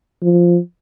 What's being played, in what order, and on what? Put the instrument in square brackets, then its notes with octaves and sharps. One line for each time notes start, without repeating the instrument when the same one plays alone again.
[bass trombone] F3